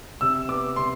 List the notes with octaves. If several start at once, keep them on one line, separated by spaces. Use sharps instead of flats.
C3 E6
B3 D6
C3 C6